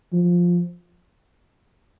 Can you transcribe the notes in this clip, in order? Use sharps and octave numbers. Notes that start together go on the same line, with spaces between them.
F3